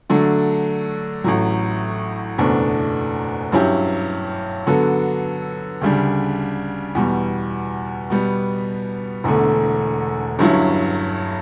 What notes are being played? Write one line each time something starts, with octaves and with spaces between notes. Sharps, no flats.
D3 F#3 A3 D4
A1 A2 F#3
F#1 E2 B2 A3 D4
G2 F#3 C#4 E4 G4
D3 F#3 B3 F#4 A4
D2 C#3 G3 D4
E2 B2 G3
B2 G3 B3
E1 E2 D3 A3
G1 G2 F#3 C#4 E4